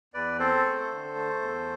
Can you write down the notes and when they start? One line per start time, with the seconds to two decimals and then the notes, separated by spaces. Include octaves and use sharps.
0.14 E2 B4 D5
0.39 C4 A4 C5
0.65 A3
0.91 D3
1.16 A3
1.41 E2